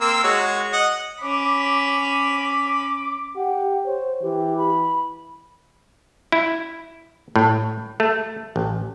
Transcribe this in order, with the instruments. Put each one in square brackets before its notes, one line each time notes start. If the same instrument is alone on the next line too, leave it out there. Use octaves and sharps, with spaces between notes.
[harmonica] A#3 C4 E6
G#3 F#4 C#5
D#5 F#5
[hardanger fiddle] C#4 B5 [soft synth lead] D6
[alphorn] G4 [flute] F#5
[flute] C5 [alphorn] C#5
[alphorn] E3 [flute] G4
[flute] B5
[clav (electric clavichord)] E4
A2
A3
A1